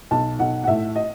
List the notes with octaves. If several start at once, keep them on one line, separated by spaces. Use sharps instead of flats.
B1 A5
B1 F#5
F#5
A2 E5
D#5